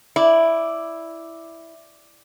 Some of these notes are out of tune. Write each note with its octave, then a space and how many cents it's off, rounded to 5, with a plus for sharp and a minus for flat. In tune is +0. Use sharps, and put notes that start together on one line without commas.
E4 +0 D5 +0